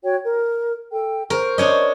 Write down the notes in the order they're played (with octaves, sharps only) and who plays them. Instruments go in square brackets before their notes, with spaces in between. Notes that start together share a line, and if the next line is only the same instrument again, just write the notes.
[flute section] F#4 C#5 G5
A#4
A4 G5
[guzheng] A#4 [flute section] C5 C#6
[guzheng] D4 C#5 D#5